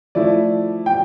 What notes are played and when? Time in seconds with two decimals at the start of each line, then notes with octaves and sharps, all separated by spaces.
0.15 F3 A3 E4 D5
0.86 G5